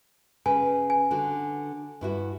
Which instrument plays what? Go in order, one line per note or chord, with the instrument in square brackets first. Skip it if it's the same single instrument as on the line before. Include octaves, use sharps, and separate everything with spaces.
[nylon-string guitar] C#3 B4 [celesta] G#5
[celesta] G#5
[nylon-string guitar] D3 F#4
G2 E4 F#4